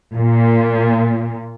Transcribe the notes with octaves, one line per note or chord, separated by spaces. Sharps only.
A#2